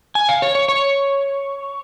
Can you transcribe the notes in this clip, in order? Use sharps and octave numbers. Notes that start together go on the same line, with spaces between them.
G#5
F5
C#5
C#5
C#5